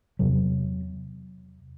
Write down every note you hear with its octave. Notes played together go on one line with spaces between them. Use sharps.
E2 C3 F#3